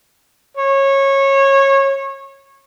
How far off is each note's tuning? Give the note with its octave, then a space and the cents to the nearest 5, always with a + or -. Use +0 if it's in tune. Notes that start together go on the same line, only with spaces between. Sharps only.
C#5 -20